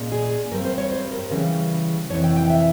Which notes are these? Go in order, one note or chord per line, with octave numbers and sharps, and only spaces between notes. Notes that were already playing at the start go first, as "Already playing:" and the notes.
Already playing: A#2 G#3 C#4
G#4
G2 G3 C4 A#4
C5
C#5
C5
A#4
C#3 E3 G3 C#4
F2 C3 E3 C#5
G5
G5
E5